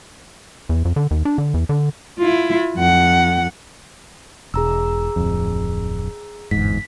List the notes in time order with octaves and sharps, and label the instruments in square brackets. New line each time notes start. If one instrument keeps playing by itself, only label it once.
[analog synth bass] E2
F2
D3
D#2
D4
D3
E2
D3
[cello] E4 F4
F2 F#5
[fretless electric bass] E1 [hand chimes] G#4 A#5 E6
[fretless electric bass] D1 F2
[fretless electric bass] G1 E2 G#2 [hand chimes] B6